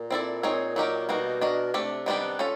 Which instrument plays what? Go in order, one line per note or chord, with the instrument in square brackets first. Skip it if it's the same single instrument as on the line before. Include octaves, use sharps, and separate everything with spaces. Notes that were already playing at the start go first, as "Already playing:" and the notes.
Already playing: [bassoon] A#2
[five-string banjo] C4 E4 A4 D5
C4 D#4 G#4 C#5
F#3 A#3 D#4 G4 A#4
[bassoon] B2 [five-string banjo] G3 A#3 D#4 F#4
[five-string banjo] D4 F#4 A#4 D#5
[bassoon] C3 [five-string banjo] A3 D4 G4
[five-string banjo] D#3 G3 B3 D4 G4
C#4 F4 A4